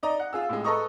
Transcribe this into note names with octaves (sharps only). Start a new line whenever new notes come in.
D#4 D5 D#5 A#5
F#5
F4 G#4 E6
A2 G#3
A4 B4 D#5 A#5 C#6 D#6